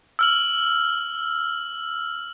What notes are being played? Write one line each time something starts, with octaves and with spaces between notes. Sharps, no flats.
E6 F6 F#7